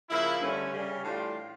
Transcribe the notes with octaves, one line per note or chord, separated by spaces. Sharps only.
C#3 F3 A#3 E4
G2 D3 A3 C#4
C#3 G3 C#4
A2 E3 G3 D4 F4